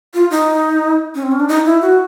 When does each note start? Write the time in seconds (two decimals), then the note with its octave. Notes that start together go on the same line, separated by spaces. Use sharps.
0.14 F4
0.31 D#4
1.15 C#4
1.23 C4
1.32 C#4
1.40 D4
1.49 D#4
1.65 E4
1.82 F#4